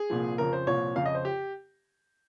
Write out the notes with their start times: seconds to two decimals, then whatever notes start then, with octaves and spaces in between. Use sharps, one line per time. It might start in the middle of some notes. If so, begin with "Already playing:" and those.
Already playing: G#4
0.10 C2 A#2 F3
0.38 F2 C#3 F3 A#4
0.53 C5
0.67 C2 A#2 F3 C#5
0.96 F2 C#3 F3 F5
1.06 D#5
1.15 C5
1.25 G4